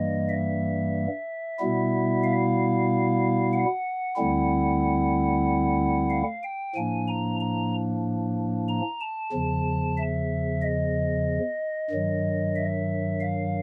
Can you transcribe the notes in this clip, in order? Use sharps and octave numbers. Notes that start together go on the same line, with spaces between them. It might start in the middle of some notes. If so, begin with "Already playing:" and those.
Already playing: G2 E3 G3 A#3 D#5
E5
B2 G3 B3 E4
F5
F#5
D2 D3 G3 C4 E4
F5
G5
A2 F3 A#3 D4 G#5
A#5
A#5
A#5
A5
E2 C#3 F3
E5
D#5
G2 D#3 F#3
E5
F5